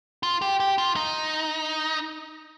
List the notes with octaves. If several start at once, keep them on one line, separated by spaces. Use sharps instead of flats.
F4
G4
G4
F4
D#4